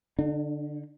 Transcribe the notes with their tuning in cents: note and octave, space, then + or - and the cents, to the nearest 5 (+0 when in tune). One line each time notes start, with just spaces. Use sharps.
D3 +0 D4 +45